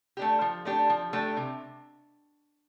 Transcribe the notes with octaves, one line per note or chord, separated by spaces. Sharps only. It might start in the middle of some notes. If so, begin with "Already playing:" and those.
A3 D4 G4
F3
A3 D4 G4
F3
A3 D4 G4
C3